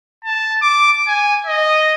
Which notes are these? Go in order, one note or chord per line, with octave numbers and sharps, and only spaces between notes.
A5
D6
G#5
D#5